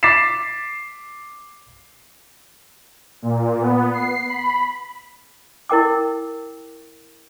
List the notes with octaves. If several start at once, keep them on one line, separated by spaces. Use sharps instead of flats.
D6 A6 B6 C7 E7
A#2
B3
C7
B5
E4 A#4 G5 D6